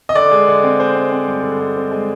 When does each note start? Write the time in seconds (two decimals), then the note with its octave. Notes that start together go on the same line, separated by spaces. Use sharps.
0.09 D#5
0.15 D3 D5
0.32 G#3
0.48 D3
0.63 C4
0.80 G#3 C5
0.96 C4
1.12 C4
1.28 G2
1.43 D3
1.59 G#3
1.76 C4
1.91 G#3